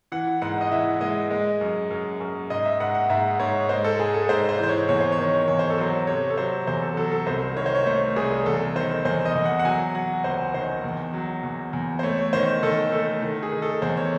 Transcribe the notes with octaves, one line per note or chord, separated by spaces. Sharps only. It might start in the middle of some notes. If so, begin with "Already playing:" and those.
E3 F#5
G#2 F#5
D#5
E3 E5
G#3 D#5
G#3
F#2
F#2
F#2
G#2 D#5
E5
G#2 F#5
F#5
G#2 E5
G#2 C#5
G#3 C5
A4
G#2 G#4
A4
G#2 C5
C5
E3 C5
C#5
E2 C#5
C5
C#5
D#3
E2 C#5
C5
A4
F#3 C5
C3 C#5
A4
F#3 C5
E2 C5
A4
F#3 A4
A4
C2 C5
D#3 C#5
C5
C#5
A3 C5
C2 G#4
E2 A4
D#3 C5
E2 C5
D#5
E2
F#5
F#5
F#3 G#5
F#3 F#5
C#2 C5
D#3 C5
E2
F#3
E2
E2
C5
A3 C#5
C#5
D#3 C5
D#3 A4
A3 A4
D#3
G#4
D#3
A4
E2 C5
C#5